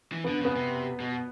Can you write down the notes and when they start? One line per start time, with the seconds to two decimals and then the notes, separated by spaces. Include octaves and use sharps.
0.12 E3
0.24 B3
0.28 D3
0.41 C#3 B3
0.56 C3
1.00 B2